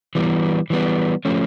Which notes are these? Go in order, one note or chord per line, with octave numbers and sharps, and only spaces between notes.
E3 G3 B3
E3 G3 B3
F3 A3 C#4